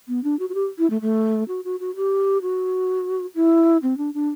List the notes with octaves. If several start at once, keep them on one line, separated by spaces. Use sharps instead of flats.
B3
D4
F#4
F#4
G4
E4
A3
A3
F#4
F#4
F#4
G4
F#4
E4
C4
D4
D4